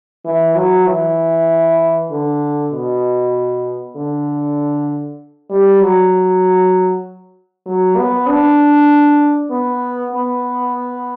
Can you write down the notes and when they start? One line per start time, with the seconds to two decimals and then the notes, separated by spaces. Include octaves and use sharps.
0.25 E3
0.56 F#3
0.87 E3
2.11 D3
2.72 B2
3.96 D3
5.51 G3
5.81 F#3
7.66 F#3
7.97 B3
8.28 D4
9.50 B3
10.13 B3